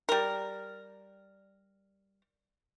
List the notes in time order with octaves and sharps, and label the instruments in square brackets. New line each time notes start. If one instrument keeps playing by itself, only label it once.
[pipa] G3 A#4